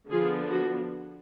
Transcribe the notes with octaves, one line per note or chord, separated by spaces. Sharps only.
D3 F3 B3 D4 F4 G#4
F#4